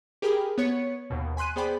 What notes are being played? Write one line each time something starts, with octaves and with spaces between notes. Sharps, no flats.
G4 G#4 A#4 G5 B5
B3 C#5 C#7
D#2 B2
G#5 B5 C6 F#6 D#7
B3 G#4 C5 D5 G5 B5